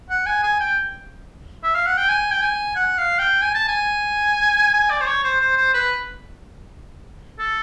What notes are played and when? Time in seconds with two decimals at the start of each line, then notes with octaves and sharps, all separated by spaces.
0.10 F#5
0.26 G#5
0.43 G#5
0.60 G5
1.64 E5
1.75 F5
1.86 F#5
1.98 G5
2.09 G#5
2.31 G5
2.42 G#5
2.76 F#5
2.98 F5
3.19 G5
3.42 G#5
3.54 A5
3.68 G#5
4.74 G#5
4.90 D5
5.01 C5
5.07 C#5
5.24 C5
5.41 C5
5.57 C5
5.74 B4
7.39 A4